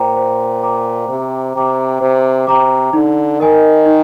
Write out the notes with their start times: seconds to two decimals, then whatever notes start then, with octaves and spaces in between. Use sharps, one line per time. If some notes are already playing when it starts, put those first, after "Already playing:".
Already playing: A#2 C5 G5 A#5 D6
0.16 C5
0.63 G5 A#5 D6
1.09 C3 C5
1.55 C3 G5 A#5 D6
2.01 C3 C5
2.47 C3 G5 A#5 D6
2.93 D3 D#4
3.40 D#3 A#4 D#5 G#5
3.86 D#4